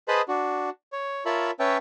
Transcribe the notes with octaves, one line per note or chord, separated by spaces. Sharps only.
G#4 B4 C5 D#5 A5 B5
D4 F#4
C#5
F4 A#4 C#5 E5 A5 B5
C#4 B4 C#5 E5 G5 A5